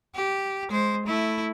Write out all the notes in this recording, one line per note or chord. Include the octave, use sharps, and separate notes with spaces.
G4
G#3 C5
A3 E4